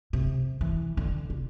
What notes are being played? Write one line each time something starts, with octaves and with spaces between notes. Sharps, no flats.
C3
E3
D3
C3